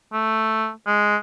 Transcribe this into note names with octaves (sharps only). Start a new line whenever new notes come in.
A3
G#3